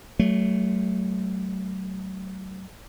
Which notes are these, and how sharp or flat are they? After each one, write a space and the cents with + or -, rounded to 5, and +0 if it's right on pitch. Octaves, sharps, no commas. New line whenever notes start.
F#3 +35 A3 +0